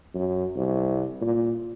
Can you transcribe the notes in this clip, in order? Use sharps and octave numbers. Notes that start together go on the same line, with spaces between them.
F#2
C2
A#2